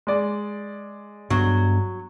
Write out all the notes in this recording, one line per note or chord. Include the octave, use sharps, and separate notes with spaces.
G#3 D5
G2 F#3 B3 D4